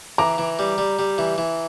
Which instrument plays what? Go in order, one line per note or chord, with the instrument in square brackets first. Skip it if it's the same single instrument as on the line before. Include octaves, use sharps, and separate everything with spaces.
[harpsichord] E3 [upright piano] A#5 D6
[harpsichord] E3
G3
G3
G3
E3
E3